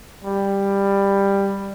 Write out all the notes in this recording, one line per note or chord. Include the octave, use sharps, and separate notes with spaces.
G3